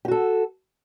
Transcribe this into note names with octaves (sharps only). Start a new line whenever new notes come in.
F#4 G4 A4